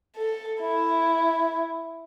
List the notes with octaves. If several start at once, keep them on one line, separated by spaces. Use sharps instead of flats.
A4
E4